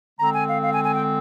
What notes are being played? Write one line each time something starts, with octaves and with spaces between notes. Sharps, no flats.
D3 G#3 C4 A#5
G#5
F5
F5
G#5
G#5
G5